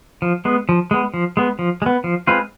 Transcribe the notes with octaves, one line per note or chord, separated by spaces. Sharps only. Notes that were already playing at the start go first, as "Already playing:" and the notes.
F3
G#3 B3
F3
G#3 B3
F3
G#3 B3
F3
G#3
B3
F3
G#3 C4 F4 B4